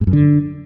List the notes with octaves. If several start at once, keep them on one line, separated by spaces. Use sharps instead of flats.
G#2
F#2
D3